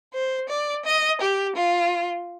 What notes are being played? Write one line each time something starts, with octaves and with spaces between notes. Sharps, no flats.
C5
D5
D#5
G4
F4